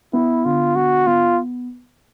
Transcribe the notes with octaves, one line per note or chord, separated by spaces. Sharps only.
B3 E4
D3 F4
B3 F#4
B3 F4